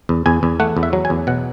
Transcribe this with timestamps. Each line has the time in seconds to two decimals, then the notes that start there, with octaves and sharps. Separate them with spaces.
0.09 E2
0.26 E2 G#5
0.43 E2
0.60 A3 F#5
0.77 E2
0.83 E5
0.93 F#3
1.05 G#5
1.10 E2
1.27 B2 F#5